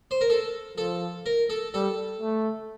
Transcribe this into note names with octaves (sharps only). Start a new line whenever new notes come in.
C5
A#4
A4
F3 A4
A#4
A4
G3 A4
A3